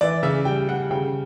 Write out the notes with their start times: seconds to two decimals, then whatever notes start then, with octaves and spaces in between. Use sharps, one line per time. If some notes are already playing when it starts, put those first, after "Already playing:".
0.01 E3 D5
0.23 C#3 E5
0.45 G3 G5
0.68 G3 F#5
0.91 C#3 G5